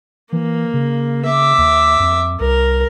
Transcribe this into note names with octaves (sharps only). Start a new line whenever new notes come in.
E3 A#3
C#3
E5 D6
D#2
F2
C2 A#4